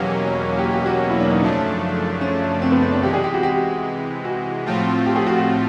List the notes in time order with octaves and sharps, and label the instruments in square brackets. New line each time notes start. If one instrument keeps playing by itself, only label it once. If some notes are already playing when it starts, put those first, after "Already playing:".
Already playing: [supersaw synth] E2 B2 F#3 A#3 C#4 [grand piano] G4
[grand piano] G4
G4
F#4
E4
D4
D#4
[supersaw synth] F#2 C#3 F3 A3 D4 [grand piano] C#4
[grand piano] C#4
C4
B3
C4
D4
[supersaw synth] C3 E3 G#3 [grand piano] G4
[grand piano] G#4
G4
F#4
G4
F#4
[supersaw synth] A2 F3 A3 C4 F4
[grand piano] G4
G#4
F#4
F#4